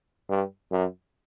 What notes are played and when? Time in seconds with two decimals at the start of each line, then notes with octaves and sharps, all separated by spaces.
0.29 G2
0.71 F#2